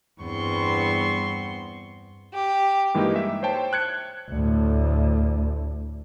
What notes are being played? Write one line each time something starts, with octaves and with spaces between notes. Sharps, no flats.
E2 G2 B3 C4 C6 C#6
G4
G2 E3 G#3 A#3 D#4 G4
E5
C5 C#5 G5 A5
F#6 G#6 C#7
D2 A2